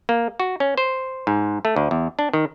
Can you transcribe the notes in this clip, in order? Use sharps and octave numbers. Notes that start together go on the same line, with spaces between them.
A#3
F#4
C#4
C5
G#2
A3
D2
E2
D4
D#3